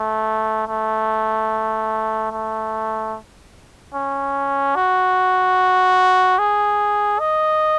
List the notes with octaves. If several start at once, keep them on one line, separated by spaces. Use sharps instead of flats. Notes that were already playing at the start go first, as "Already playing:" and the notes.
Already playing: A3
A3
A3
C#4
F#4
G#4
D#5